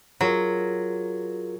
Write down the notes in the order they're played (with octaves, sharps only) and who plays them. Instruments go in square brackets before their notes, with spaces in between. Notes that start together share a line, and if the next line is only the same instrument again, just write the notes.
[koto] F#3 [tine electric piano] F4 G#4 A#4